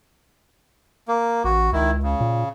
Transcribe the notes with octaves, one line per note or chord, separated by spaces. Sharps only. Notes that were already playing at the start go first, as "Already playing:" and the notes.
A#3
A1 F#4
C#2 D#3 E4
C#3
A#2